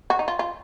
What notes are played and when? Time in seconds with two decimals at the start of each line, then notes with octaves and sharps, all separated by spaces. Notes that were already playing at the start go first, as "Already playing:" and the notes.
0.10 F#4
0.19 D#4
0.28 F4
0.39 F4